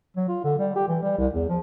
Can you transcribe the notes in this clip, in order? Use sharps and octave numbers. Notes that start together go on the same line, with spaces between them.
F#3
F4
D3
G3
G4
E3
G3
C2
E2
F3